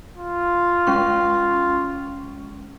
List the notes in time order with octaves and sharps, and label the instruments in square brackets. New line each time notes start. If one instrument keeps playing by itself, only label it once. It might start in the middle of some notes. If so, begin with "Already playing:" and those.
[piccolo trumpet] F4
[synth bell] G#3 C#4 C#6